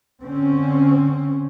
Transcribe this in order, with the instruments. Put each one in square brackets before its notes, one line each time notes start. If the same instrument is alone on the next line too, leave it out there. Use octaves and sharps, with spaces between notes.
[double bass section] D3 C4 C#4